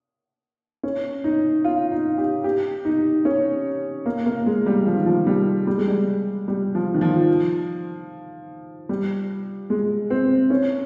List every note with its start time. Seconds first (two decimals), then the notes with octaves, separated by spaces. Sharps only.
0.83 C#4
1.24 D#4
1.65 F4
1.92 D#4
2.18 G4
2.44 G4
2.85 D#4
3.25 C#4
4.06 A#3
4.26 A#3
4.46 G#3
4.66 G3
4.87 F3
4.96 D#3
5.06 F3
5.27 G3
5.67 G3
5.78 G#3
5.88 G3
6.48 G3
6.75 F3
6.94 D#3
7.01 F3
8.89 G3
9.70 G#3
10.10 C4
10.50 C#4